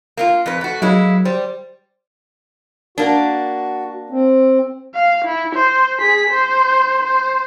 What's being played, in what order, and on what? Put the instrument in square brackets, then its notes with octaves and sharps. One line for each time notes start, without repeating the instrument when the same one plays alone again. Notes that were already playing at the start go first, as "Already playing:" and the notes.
[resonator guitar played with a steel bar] A#3 E4 F4
F2 B4
A3 F#4
[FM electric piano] F#3 [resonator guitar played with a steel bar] G#3 A#3 E4
[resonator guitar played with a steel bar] G3 [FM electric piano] C5
[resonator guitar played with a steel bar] A#3 D4 [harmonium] F#4
[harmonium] C4
[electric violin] F5
E4
C5
G#4 B6
C5
C5